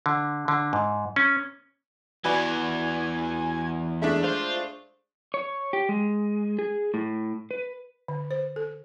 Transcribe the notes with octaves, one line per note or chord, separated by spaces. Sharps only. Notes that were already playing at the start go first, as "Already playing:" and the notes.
D3
D3
G#2
C#4
E2 E3 F#4 B4 D5 G#5
G#3 A3 D4 E5
F4 C5
C#5
G4
G#3
G#4
A2
B4
D3
C5
A4